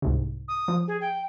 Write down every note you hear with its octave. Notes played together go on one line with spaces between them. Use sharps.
C2 G#2 C3
D#6
F3
G#4
G5